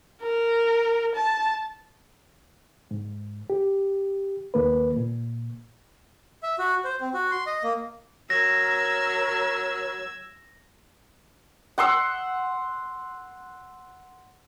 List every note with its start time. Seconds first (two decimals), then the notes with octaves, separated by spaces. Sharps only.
0.22 A#4
1.15 A5
2.91 G#2
3.50 G4
4.54 D#2 A#3 B4
4.96 A#2
6.43 E5
6.59 F#4
6.84 C5
7.01 C4
7.14 F#4
7.31 C6
7.47 D#5
7.63 A#3
8.30 F#3 A#4 E6 G#6 A#6
11.78 F#5 C6 E6